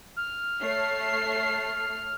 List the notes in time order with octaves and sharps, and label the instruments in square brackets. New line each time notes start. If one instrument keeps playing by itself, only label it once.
[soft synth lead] F6
[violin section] A3 C#5 C7